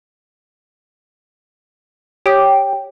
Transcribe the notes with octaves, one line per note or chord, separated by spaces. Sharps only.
G4 C#5 D#6